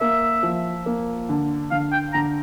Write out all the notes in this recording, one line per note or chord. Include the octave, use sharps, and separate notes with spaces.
A#3 E5
F3
A#3
D3
D3 F5
G5
D3 A#5